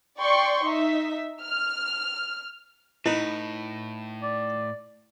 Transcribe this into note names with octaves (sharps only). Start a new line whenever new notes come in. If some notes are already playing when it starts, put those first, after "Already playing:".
D5 G5 C6 C#6
D#4 E5
F6
A2 D#4 E4 B4
D5